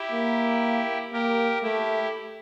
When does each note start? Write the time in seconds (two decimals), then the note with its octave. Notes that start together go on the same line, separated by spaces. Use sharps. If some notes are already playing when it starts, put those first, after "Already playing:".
Already playing: E4 G4
0.12 A#3
1.12 A#3 G4 A#4
1.63 A3 E4 G4